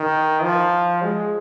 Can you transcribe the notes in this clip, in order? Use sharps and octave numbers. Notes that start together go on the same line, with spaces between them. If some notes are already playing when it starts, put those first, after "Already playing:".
Already playing: D#3
F3
G#3